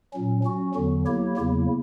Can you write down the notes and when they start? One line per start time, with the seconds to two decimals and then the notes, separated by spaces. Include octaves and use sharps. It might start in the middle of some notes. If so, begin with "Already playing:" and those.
0.14 A#2 F#3 C#4
0.44 F#3 C#4 F#4
0.75 E2 D3 F#3
1.06 F#3 A#3 E4 G4 C#5
1.37 E2 C#3 F#3 A#3 E4